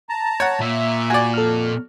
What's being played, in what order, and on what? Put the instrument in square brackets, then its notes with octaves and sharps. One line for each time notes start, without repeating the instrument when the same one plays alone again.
[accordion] A5 A#5
[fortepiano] C#5 F#5
[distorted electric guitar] A#2 [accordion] E5
[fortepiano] F#4 D5 [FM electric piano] G#5
[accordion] F2 [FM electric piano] A4 F6